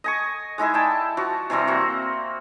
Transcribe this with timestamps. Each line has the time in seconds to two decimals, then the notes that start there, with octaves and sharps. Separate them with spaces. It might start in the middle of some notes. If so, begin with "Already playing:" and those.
0.04 D#5 G#5 C#6
0.58 G#3 D#4 E4 G#4
0.74 D5 G5 A5
1.17 F3 F#4
1.50 C3 E3 G3 C4
1.67 A#3 F#4